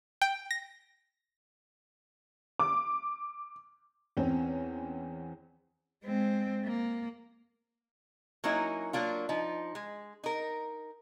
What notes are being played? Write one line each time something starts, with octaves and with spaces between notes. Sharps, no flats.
G5
A#6
D6
E2 C4 C#4
G#3 C4
A#3
F#3 A#3 C#4 D#4 E4
F#3 A#3 D4 F4
F3 D#4
G#3
D#4 A#4